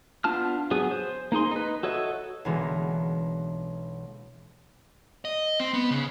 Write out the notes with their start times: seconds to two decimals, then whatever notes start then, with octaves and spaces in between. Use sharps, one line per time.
0.24 B3 D4 F4 A5 F6
0.71 F#3 B3 G#4
0.91 C5
1.32 A#3 D#4 G#4 C6
1.51 D#4 B4
1.83 F#4 A4 C#5 D#5 E5
2.45 B1 D3 E3 G#3 A#3 B3
5.25 D#5
5.60 C4
5.74 B3
5.91 C#3